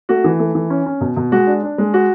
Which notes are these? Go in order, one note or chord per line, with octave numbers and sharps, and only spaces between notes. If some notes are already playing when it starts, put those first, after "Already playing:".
A3 F#4
E3
A3
E3
C#4
C#4
B2
B2
G#3 F#4
D4
D4
G#3
F#4